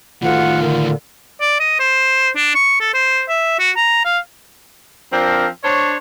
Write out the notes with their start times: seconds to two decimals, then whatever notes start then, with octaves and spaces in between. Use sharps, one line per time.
0.23 D2 A2 D#3 F4 F#5
0.61 A#2 D3
1.41 D5
1.60 D#5
1.80 C5
2.36 D4
2.55 C#6
2.80 A4
2.94 C5
3.29 E5
3.59 F#4
3.77 A#5
4.05 F5
5.12 F3 C4 D4 A#4
5.64 D4 C5 C#5